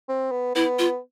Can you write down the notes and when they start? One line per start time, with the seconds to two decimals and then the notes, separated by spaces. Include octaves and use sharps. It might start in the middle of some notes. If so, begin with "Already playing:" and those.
0.09 C4
0.31 B3
0.55 B3 E4
0.79 F4